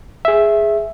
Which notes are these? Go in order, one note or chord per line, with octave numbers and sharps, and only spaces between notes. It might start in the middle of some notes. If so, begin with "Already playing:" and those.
G#4 E5